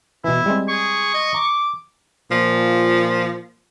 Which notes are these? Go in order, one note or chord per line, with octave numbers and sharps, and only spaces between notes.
B2 E3 E4
G3 G#3 C4
G#4 C#6
D#5
A#5 D6
A#2 F3